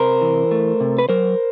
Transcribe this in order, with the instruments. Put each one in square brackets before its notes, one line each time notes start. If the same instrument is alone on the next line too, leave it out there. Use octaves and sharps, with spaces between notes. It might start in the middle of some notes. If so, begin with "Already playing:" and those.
Already playing: [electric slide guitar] C3 A#4 C5
E3
A3
C3
B4
F#3 A#4 C5